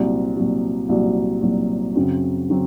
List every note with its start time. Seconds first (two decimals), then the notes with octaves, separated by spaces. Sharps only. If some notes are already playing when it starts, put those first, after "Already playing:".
Already playing: C2 A#2 F#3 C4 F#4
0.36 C2 A#2 F#3 C4 F#4
0.89 C2 A#2 F#3 C4 F#4
1.42 C2 A#2 F#3 C4 F#4
1.95 F#2 C#3 F#3 C4 F#4
2.50 C#3 F#3 C4